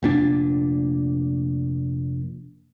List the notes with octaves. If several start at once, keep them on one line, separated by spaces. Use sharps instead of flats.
F1 A#2 D4